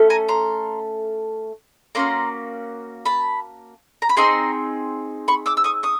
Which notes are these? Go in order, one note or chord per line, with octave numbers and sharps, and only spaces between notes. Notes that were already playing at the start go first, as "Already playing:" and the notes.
Already playing: A3 C#4 A4
G#5 A#5
A#5 C6
A#3 C#4 F#4 A#5 C6
A5 B5
A#5
B5
C4 D#4 G#4 A#5 C6
B5 C#6
D6 E6
E6
C#6 D#6
C#6 D#6